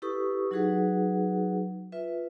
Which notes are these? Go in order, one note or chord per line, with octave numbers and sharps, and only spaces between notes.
E4 G4 A4 B4 C#6 D#6
F#3 D#4 F#4 G#4 B4 F#5
F4 B4 E5